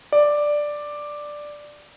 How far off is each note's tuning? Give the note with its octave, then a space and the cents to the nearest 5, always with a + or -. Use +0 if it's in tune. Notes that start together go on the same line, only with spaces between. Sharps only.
D5 +5